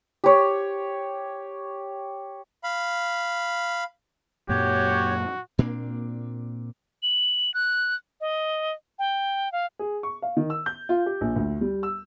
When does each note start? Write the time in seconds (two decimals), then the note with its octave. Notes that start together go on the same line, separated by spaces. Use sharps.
0.24 G4 C#5
2.64 F5 B5
4.49 F#2 A#2 F#3 F#4 G4 C#5
5.59 A#2 A#3 C4 D4
7.03 F#7
7.54 F#6
8.21 D#5
8.99 G5
9.52 F5
9.79 G#4
10.03 C#6
10.22 F5
10.37 D#3
10.50 E6
10.66 G6
10.89 F4
11.06 G4
11.21 A#1
11.36 D2
11.61 G3
11.83 E6